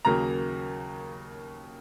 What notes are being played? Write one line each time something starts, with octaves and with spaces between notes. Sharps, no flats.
D#2 C#3 F#3 A#3 A#5